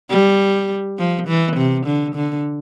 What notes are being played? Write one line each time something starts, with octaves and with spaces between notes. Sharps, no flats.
G3
F3
E3
C3
D3
D3